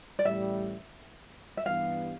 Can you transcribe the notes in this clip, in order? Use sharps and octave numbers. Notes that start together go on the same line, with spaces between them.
D5
A1 A2 G3 E5
E5
G2 E3 G3 B3 F5